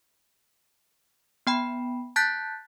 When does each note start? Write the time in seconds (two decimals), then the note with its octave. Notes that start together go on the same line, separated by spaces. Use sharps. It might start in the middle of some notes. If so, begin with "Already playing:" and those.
1.47 B3 G5 B5
2.16 A5 F#6 G6 A6 B6